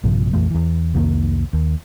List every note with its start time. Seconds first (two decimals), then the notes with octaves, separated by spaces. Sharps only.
0.03 A#1 G2 C3 F3
0.33 A#1 F2 E3 A3
0.51 E2 E3
0.94 C2 F2 D#3 A#3
1.53 D#2